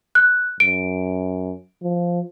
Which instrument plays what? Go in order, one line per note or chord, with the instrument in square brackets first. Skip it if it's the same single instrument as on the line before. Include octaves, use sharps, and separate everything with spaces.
[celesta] F#6
[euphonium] F#2 [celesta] D7
[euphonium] F3